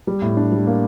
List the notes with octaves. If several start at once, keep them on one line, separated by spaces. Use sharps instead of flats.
G3
A2
D4
G3
A#3